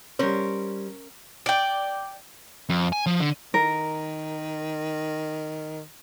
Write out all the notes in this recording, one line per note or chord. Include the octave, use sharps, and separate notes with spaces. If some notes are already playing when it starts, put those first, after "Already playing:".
G3 C#4 A#4 C5
D5 G5
F2
G#5
F3
D3
D#3 A#4